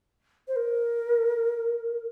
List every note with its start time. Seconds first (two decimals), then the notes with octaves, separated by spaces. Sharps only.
0.48 C5
0.56 A#4